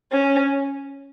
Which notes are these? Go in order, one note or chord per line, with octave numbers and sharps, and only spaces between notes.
C#4